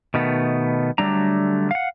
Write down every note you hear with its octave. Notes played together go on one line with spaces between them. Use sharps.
B2 D#3 A3 B3
D3 F#3 G3 A3 D4 A#5
F5 F#5